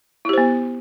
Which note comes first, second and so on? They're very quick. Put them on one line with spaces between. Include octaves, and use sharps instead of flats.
E4 G4 C5 B3